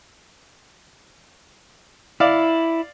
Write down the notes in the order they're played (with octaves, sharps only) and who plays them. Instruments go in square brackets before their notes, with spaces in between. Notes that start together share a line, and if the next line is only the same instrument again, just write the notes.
[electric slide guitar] E4 [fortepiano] D5 F5